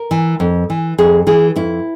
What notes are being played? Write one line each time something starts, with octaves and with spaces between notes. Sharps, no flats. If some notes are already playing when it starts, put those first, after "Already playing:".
Already playing: A#4
E3
F2
E3
F2 G#4
E3 G#4
F2 E4